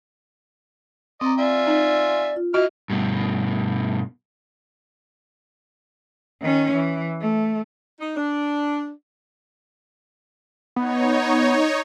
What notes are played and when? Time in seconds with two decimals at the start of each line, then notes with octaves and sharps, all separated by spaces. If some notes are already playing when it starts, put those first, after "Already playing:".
1.21 C4 D5 D#5 A#5 D#6
1.38 F4 D5 E5 G#5
1.67 D#4
2.36 F4
2.54 E4 F#4 D#5 F6
2.90 G2 B2
6.42 D#3 C#4
6.74 E3
7.21 A3
8.00 D#4
8.16 D4
10.76 B3 D#4 C#5